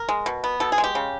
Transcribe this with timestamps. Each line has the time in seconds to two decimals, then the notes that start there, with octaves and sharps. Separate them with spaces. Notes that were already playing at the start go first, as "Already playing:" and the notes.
Already playing: A#4
0.09 G#3
0.26 B2
0.44 B3
0.60 B2 A4
0.72 G#4
0.78 G#3
0.84 G4
0.95 C#3